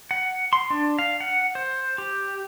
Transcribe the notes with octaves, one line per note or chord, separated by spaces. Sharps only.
F#5
C6
D4
F5
F#5
C5
G4